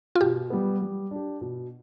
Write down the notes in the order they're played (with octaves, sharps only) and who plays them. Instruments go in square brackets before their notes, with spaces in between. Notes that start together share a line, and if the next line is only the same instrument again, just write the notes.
[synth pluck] F4
[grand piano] B2 [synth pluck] G4
[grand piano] G3 B3
G3
D4 G4
B2